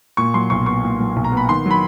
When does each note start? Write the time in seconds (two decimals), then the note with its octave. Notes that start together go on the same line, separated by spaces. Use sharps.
0.17 A#2 C#6
0.34 F#3 C6
0.50 B1 C#6
0.66 B3 C#6
0.84 A#2
1.00 F#3
1.16 B1
1.24 A#5
1.32 B3
1.37 B5
1.49 D#3 C6
1.66 F#3 B5